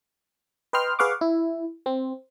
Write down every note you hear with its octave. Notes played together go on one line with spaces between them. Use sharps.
B4 D#5 G5 C6 F6
G#4 B4 F5 F#5 C#6 D6
E4
C4